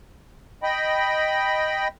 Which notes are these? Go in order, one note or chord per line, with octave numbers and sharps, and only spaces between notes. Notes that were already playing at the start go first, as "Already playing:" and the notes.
D#5 G5 B5